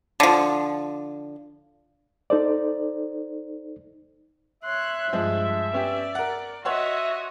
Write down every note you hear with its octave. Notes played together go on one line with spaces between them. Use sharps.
D3 F3
D#4 A4 C5 D5
C#5 E5 C6 F#6
G2 F3 G#3
B3 C#4 G4 D5
A#4 F#5
F#4 C#5 D#5 E5 F#5 C6